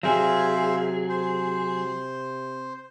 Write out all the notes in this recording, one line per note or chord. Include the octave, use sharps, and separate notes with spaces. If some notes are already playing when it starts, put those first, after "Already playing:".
C3 F#3 G#4 C5 E5 F5
C5